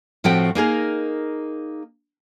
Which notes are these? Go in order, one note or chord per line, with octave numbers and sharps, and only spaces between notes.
A2 F3 A3 C4 F#4 G5
A#3 D#4 G#4 A#4